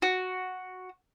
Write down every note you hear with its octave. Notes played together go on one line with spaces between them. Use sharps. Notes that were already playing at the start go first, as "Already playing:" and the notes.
F#4